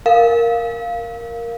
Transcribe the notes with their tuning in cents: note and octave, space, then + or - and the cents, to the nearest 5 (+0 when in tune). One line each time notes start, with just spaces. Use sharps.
A#4 +0 F5 +0